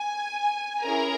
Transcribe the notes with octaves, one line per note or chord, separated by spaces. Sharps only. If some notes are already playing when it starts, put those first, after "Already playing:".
Already playing: G#5
C#4 E4 G#4 A#4 A#5